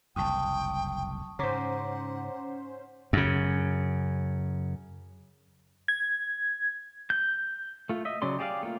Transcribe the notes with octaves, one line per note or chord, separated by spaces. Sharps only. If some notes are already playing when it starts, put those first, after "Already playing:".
F#1 C2 F2 G5 A5 C#6 D#6
G#2 C#3 C#4 C5 F#5 A#5 D6 B6
F#2 C#3
G#6
G6
A3 F4
D#5 E5
C#3 F#3 C#4 D5 C6
G4 G#4 D5 D#5 F5
A3 A#3 F4